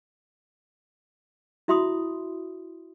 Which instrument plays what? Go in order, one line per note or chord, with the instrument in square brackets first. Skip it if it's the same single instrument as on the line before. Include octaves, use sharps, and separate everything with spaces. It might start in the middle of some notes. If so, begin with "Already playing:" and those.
[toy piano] E4 F#4 E5 B5 C6 D#6